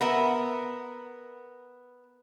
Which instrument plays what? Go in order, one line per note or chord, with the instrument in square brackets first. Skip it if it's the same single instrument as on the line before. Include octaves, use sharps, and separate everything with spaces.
[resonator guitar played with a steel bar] B3 A#4 E5